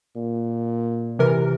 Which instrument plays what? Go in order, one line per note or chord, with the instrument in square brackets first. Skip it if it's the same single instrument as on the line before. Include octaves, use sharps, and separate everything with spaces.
[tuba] A#2
[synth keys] C3 E3 A#4